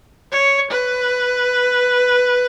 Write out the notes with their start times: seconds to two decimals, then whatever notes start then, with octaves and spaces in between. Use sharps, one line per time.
0.32 C#5
0.71 B4